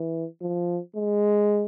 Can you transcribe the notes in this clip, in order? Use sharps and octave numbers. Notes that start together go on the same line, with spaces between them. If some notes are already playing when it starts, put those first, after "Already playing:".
Already playing: E3
F3
G#3